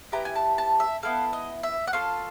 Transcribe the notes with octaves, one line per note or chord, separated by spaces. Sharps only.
B3 E4 G4 A#5
G#5
A5
A5
E5
B3 E4 A4 F5
D#5
E5
F#5
C#4 F4 A4 F5